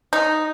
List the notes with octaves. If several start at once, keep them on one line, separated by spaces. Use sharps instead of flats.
D#4